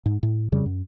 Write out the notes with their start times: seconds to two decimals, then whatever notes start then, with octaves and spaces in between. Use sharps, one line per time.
0.06 G#2
0.23 A2
0.52 F2 C#3 G3
0.66 F#2